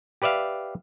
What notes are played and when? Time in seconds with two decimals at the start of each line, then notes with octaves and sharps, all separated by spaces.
0.22 G4 B4 D5 E5 F5